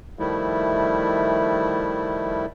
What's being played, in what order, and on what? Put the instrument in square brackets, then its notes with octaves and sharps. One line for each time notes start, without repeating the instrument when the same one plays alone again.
[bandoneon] D#3 F3 G3 A3 E4